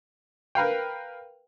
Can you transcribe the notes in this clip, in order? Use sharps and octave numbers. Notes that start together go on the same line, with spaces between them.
A#4 B4 F5 G5